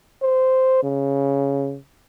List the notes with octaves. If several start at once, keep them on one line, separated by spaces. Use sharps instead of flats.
C5
C#3